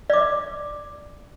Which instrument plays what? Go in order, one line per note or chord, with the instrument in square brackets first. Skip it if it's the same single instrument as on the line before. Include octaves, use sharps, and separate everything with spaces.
[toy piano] D5 D6